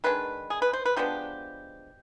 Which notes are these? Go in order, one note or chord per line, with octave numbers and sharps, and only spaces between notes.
D#3 G#3 D4 B4
G#4
B4
C5
B4
F3 G#3 B3 D4 G4